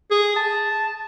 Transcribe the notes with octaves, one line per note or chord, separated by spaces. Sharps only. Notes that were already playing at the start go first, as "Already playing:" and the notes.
G#4
A5